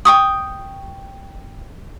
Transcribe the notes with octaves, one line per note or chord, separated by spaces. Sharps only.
G5 C#6 D#6